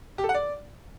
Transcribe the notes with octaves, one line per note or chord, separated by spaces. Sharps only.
G4
A4
F#5
D5